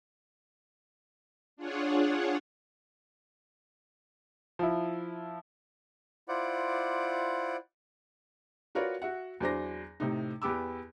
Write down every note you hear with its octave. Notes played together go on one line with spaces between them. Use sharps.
D4 F4 G#4 C#5 F#5
F3 E4
E4 F4 C5 D5 F#5 D6
F4 F#4 A#4 B4 C#5 D5
F#4 E5 F#5
E2 F#3 D4 C5 D6 A#6
A2 C3 D#4
E2 B3 G4 D6 E6